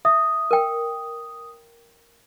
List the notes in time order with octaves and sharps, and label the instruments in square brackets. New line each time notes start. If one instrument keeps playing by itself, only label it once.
[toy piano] E5 [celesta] D#6
[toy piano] A#4 G5